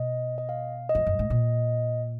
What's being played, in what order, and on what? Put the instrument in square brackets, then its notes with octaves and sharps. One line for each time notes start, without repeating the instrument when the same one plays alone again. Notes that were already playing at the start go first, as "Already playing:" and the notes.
Already playing: [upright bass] B2 [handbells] D#5
[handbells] D#5
F5
D#5
[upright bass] F2
F#2
G#2
A#2